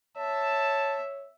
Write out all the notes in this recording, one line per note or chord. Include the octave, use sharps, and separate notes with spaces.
C#5 E5 A5